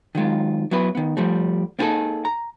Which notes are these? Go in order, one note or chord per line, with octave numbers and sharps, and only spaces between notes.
D#3 F#3 G#3 F4
F#3 B3 E4 B4
D#3 B3
F3 G3 A3
A#3 B3 D#4 E4 G#4 A4
A#5